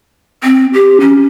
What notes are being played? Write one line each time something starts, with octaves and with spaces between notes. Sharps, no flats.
C4
G4
C#4